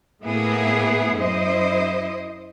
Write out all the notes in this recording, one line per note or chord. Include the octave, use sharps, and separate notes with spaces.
A2 A#3 B3 E4 G#4
F#2 E4 C5 D#5